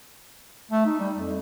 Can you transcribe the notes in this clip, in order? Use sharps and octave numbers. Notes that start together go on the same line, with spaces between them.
A3
D#4
G3
F2